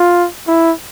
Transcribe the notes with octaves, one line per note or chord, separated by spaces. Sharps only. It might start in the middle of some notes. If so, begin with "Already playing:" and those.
Already playing: F4
E4